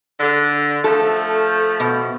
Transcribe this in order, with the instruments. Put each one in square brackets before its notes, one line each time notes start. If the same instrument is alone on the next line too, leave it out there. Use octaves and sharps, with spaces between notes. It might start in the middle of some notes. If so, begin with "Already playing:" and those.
[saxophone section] D3
[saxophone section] F3 A3 [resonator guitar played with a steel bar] A4
[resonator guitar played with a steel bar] B2